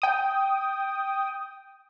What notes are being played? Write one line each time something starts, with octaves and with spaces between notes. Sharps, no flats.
G5 D#6